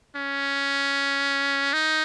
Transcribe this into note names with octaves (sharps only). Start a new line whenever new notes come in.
C#4
D#4